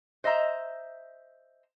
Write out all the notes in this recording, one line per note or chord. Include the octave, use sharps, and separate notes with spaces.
C5 D#5 E5 A#5